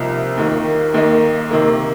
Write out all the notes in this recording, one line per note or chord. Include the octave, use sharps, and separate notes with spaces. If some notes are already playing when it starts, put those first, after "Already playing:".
Already playing: C2 C3 F3 A#3 D#4
D#2 D#3 A#3
D#2 D#3 A#3 D#4
C3 D#3 A#3